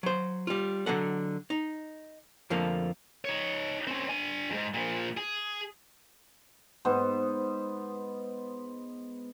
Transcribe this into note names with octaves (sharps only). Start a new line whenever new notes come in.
F#3 C5
G3 F4
D3 F#3 A4 F#5
D#4
F2 D3 F3 A3 A#3
D#4 C#5
C4 C#4
D4 G#5
F2 G#2
A#2 F3
G#4
G#2 B3 C5